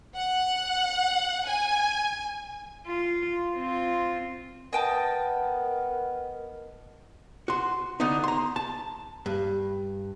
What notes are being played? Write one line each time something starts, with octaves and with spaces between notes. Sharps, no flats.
F#5
G#5
F4
C4 F4
B3 A#4 D#5 G5 A5
F#4 C6
D3 B3 D#4
A#5 C6
A5
G2